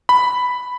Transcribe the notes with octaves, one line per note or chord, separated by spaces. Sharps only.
B5